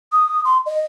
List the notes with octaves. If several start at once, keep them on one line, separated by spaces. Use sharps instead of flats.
D#6
C6
D#5